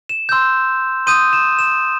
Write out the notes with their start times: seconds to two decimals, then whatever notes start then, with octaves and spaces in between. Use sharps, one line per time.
0.09 E7
0.29 C6 E6 G6
1.07 C6 D#6 G6 D#7
1.33 E7
1.59 E7